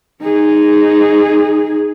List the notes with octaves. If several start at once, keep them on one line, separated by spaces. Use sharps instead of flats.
D#4 G#4